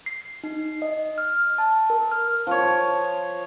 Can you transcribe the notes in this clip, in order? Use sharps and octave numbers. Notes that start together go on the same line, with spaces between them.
C7
D#4
D#5
F6
A5
A#4
F6
F3 C#5